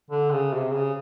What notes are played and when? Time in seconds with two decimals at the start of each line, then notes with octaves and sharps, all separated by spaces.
0.11 D3
0.31 C#3
0.53 C3
0.74 C#3